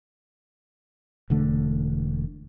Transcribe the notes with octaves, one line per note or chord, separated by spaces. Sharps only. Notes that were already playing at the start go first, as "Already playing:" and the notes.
E1 D3 A3